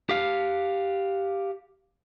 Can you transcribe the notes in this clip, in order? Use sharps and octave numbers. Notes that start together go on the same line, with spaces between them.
G4 F5